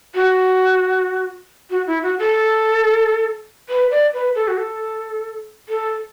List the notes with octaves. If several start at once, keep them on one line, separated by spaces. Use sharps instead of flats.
F#4
F#4
E4
F#4
A4
B4
D5
B4
A4
F#4
A4
A4